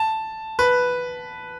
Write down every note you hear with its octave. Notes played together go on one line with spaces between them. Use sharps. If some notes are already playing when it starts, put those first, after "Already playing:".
Already playing: A5
B4